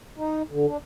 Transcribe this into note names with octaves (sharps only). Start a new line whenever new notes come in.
D#4
D3
D4